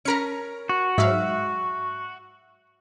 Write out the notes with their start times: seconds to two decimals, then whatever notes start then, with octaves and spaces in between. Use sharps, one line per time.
0.05 C#4 A#4 A#5 B5 C#7
0.69 F#4
0.98 G#2 F#3 E5 F5